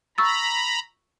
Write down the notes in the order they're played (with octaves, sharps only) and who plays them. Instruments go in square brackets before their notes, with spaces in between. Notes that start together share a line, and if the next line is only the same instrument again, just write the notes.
[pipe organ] A#5 B5 [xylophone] C#6 E6 A6